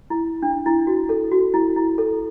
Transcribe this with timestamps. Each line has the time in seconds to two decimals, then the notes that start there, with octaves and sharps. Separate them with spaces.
0.10 E4
0.43 D4
0.66 E4
0.87 F#4
1.09 A4
1.31 F#4
1.54 E4
1.76 E4
1.98 A4